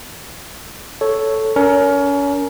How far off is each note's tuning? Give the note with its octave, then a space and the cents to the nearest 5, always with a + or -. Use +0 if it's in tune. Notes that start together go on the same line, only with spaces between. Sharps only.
A4 +0 C#5 +0
C#4 +30 A#4 +0